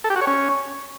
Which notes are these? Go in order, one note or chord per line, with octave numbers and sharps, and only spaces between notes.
A4
G4
F#4
C#5
C#4